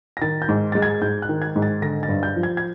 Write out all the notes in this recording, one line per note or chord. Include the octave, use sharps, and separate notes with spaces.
A#6
D#3 A6
G6
G#2
G#3 A6
G#6
G#2 G6
F#6
D#3
G#6
G#2
A6
D3 A#6
A6
G2
G6
F3
G#6
G#6